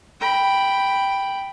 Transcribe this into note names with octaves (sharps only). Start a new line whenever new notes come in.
G5 B5